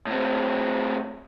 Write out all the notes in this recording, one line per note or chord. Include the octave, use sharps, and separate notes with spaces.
A2 C4